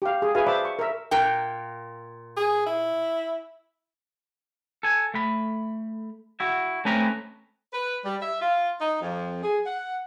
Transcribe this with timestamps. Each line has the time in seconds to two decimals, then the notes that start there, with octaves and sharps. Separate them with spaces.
0.02 G4 F5
0.22 G#4
0.35 F#4 G#4 B4 E5 F5 G#5
0.47 C5 D5 E5 A5 B5 D6
0.65 C#6
0.79 A#4 E5
1.11 A#2 A#4 G5
2.37 G#4
2.66 E4
4.83 A4 G#5
5.14 A3 B5
6.40 E4 F#4
6.85 A3 C4 C#4 B4 A#5 B5
7.73 B4
8.05 G3
8.22 E5
8.41 F4
8.81 D#4
9.01 F2
9.42 G#4
9.65 F#5